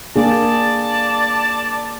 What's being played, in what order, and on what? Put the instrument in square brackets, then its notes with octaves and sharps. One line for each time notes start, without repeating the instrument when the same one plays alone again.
[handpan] A#3 D4 G#4 [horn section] D5 A5